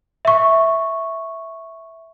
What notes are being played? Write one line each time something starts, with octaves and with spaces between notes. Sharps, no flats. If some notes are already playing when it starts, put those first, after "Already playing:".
E5 C#6